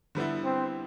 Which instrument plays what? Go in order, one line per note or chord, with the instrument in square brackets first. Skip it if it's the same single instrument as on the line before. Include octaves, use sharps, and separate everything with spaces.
[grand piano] D3 G3 B3 E4
[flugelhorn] C4